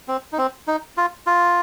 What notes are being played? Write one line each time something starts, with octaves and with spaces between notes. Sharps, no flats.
C4
D#4
C4
D#4
F4
F4